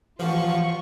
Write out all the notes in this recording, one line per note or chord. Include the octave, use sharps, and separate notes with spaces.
A1 E3 F3 F4 F#4 C#6